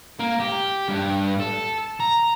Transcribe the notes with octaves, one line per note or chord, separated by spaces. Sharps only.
A#3
G4
G2
A4
A#5